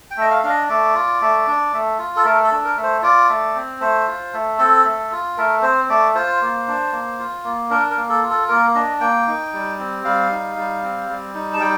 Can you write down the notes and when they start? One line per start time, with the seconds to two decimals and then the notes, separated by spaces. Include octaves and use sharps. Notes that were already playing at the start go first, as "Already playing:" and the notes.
0.11 G5
0.17 A3 D#5
0.30 F5
0.44 D4 F5
0.50 D#5
0.69 A3 D5
0.95 F4
1.22 A3
1.47 D4
1.73 A3
1.98 F4
2.16 A4
2.25 A3 A#4
2.44 A4
2.52 D4
2.64 A#4
2.77 A3
2.83 C5
3.02 F4 D5
3.29 A3
3.55 C4
3.80 A3 C5
4.08 F4
4.33 A3
4.58 C4 A4
4.84 A3
5.11 F4
5.37 A3 A#4
5.62 C4 C5
5.89 A3 D5
6.15 F4 C5
6.41 A#3
6.67 D4
6.92 A#3
7.19 F4
7.44 A#3
7.70 D4 A#4
7.90 A#4
7.96 A#3
8.09 A4
8.23 F4
8.30 A4
8.48 A#3 A#4
8.75 D4 D#5
9.00 A#3 G5
9.27 D#4
9.53 G3
9.79 C4
10.04 G3 F5
10.31 D#4
10.57 G3
10.83 C4
11.09 G3
11.34 D#4
11.53 A5
11.60 G3 G5